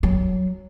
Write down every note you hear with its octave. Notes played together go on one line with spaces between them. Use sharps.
F#3